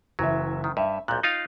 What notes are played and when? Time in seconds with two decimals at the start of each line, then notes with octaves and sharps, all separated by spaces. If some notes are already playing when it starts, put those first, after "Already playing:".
0.19 F#1 E3 F#3 E5
0.64 D#3
0.77 G2 E5
1.08 B1 A#2 F#6 G6
1.23 D#4 F4 F5